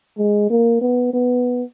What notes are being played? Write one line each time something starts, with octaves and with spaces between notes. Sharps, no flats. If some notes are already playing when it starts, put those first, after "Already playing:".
G#3
A#3
B3
B3